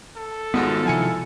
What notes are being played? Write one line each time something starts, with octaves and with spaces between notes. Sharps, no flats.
A4
G#1 D#3 G#3 B3 F4 F#4
C3 F3 E4 G#5 C#7